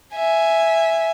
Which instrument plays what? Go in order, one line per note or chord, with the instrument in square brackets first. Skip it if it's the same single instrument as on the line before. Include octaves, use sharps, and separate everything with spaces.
[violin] E5 G#5